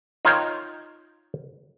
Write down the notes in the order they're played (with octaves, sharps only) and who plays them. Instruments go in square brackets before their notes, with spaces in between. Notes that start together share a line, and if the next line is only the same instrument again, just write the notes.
[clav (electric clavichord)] D#4 F4 A#4 C#5 F5 G5